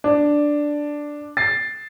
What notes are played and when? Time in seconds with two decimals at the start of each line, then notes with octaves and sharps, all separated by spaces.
0.04 D4
1.37 A6 C7